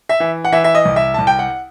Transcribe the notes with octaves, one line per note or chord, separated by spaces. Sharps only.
E5
E3
F#5
E3 E5
E5
D#5
C2
E5
C2 A5
G5
F#5